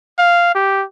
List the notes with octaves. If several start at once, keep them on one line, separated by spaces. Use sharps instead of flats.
F5
G4